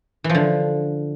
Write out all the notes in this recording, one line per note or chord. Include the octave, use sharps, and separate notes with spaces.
E3
F3
D3